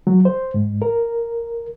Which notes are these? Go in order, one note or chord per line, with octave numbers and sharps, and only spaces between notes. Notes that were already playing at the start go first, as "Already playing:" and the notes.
F#3
C5
G#2
A#4